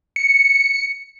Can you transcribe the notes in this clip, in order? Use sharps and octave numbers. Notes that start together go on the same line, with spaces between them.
C#7